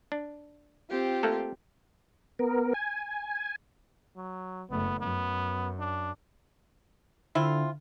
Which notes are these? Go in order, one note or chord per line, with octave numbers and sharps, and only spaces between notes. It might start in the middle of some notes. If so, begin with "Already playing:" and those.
D4
C4 F4 G4
A3 A#3 A4
B3 A#4
G#5
F#3
F#1 A3 B3
F#2 B3
D4
D3 C4 E4 F4